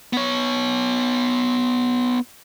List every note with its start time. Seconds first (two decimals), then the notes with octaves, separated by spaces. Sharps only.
0.13 B3 C#5